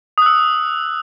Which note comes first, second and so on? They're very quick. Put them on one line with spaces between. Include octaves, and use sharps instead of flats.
D#6 F#6 E6